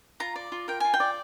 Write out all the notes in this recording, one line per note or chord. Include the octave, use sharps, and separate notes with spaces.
F4 A#5
D5
F4
A#4 G5
F4 G#5
G5
D5